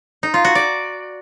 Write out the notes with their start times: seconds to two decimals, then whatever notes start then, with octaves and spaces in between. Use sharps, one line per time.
0.23 D#4
0.34 F4
0.45 F#4
0.55 D5